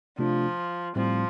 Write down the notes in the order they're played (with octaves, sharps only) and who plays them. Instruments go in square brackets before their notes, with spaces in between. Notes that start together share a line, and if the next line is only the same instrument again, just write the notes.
[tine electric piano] C3 A3 D4 F4 [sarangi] F3
[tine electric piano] A2 G3 C4 [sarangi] F3